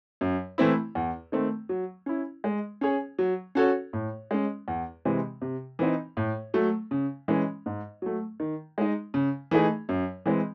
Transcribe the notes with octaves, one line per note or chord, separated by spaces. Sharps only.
F#2
E3 A3 C4 E4
E2
D#3 A3 C4
F#3
C#4 E4
G#3
C#4 G#4 C#5
F#3
C#4 F#4 A4 C#5
A2
G#3 C#4
E2
C3 E3 G#3 C4
C3
E3 C4 D#4
A2
F#3 A3
C#3
E3 G#3 C#4
G#2
F#3 A3
D#3
G#3 D#4
C#3
E3 A3 D#4 G#4
F#2
E3 G#3 C4